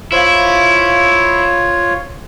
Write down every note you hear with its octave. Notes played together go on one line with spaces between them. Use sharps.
E4 F4 C5 C#5 F5